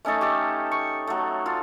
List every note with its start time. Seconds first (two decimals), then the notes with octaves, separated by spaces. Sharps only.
0.05 A3 C#4 D#4 A4
0.21 G4 A4
0.71 C#6
1.07 F#3 A3
1.46 F4 A4